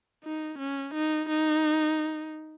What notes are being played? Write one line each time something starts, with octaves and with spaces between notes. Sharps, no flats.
D#4
C#4
D#4
D#4